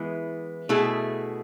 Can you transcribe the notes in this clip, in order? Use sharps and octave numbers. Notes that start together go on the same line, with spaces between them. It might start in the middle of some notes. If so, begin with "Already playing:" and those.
Already playing: E3 G#3 B3 E4
B2 A3 E4 G#4